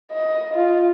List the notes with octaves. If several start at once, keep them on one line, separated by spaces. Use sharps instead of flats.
D#5
F4